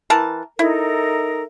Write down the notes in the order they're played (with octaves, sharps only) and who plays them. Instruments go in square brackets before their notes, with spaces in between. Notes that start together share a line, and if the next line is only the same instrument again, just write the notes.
[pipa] E3 A#4 A5
[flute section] D#4 A4 A#4 [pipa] E4